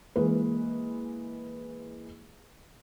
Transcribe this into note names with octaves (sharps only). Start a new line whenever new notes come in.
E3 G#3 A#3 B4